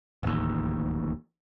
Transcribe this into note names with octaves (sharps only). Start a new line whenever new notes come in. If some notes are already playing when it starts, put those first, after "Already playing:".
D1 A1 D#2